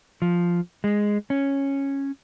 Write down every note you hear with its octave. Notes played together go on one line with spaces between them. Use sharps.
F3
G#3
C#4